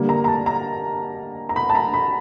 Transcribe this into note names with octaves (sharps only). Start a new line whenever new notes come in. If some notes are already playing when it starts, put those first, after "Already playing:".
Already playing: D3 G3 A#3
A#5
A#5
A5
A#5
A#5
B5
A5
A#5
B5